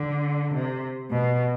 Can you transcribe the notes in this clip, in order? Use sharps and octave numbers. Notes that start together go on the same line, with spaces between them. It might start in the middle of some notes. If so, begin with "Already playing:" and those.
Already playing: D3
C3
B2